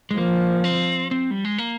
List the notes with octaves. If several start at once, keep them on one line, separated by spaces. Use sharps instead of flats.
G#3
F3 A#3
C4
C4
G3
G#3
A#3